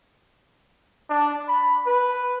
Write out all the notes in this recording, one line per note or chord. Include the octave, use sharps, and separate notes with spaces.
D4
B5
B4